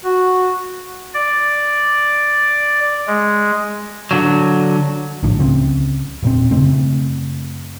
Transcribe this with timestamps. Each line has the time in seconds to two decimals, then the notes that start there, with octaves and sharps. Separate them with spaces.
0.05 F#4
1.14 D5
3.07 G#3
4.11 D3 F#3
5.23 A#1 A2 D3 F3
5.38 C#2 C#3 G3 C4
6.23 E1 A#2 C4
6.51 F#2 C#3 A3 C4